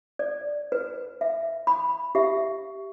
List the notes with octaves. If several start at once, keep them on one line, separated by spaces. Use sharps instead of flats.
D5
B4
E5
B5
G4 E5